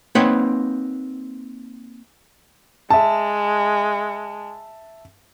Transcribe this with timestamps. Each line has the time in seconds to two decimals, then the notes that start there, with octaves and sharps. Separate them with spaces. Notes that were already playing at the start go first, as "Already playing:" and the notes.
0.15 A#3 C4 D#4 B4 C#5 F#5
2.90 G#3 E5 A5